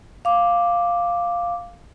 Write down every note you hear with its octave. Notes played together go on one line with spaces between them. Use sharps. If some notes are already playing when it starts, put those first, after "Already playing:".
F5 D6